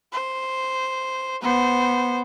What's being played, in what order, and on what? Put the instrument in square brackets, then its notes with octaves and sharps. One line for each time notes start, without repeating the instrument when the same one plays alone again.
[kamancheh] C5
[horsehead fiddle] B3 [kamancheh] C5